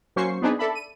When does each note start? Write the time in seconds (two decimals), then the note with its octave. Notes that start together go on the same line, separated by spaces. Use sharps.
0.16 F#3 A#3 C#4 C5 C#6 C7
0.42 B3 C4 D4 D#4 G#4 B4
0.59 A4 D5 E5 A5 B5
0.75 D#7